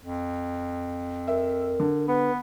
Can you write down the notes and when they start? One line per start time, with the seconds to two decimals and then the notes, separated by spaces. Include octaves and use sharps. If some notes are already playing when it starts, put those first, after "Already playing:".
0.02 F2
1.28 A#4 E5
1.80 D3
2.08 B3 B4